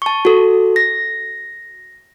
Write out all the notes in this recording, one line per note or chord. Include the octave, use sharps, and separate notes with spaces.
A5 C#6
F#4 A4
A#6